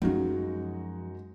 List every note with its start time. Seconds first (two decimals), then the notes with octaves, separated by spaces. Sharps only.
0.02 F#2 F3 G#3 C#4 D#4 F#4